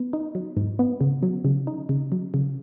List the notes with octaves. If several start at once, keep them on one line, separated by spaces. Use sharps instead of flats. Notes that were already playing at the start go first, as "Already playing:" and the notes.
Already playing: B3
D#4
F#3
G#2
B3
C#3
F#3
C#3
D#4
C#3
F#3
C#3